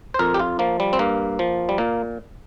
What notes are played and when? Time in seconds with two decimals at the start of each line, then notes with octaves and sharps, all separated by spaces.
0.14 C5
0.19 F2 A#4
0.34 G4
0.39 F4
0.59 F3 A#3
0.80 G3
0.93 C4
0.99 G2 A#3
1.39 F3
1.69 G3
1.78 A#2 A#3